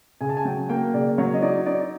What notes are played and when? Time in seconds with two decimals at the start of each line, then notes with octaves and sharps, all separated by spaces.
0.21 C#3 G#5
0.29 A5
0.37 G#5
0.45 F#3 G5
0.69 A#3 G5
0.94 C#3 D5
1.18 F#3 C#5
1.34 D#5
1.42 D#4 D5
1.66 D#4 D5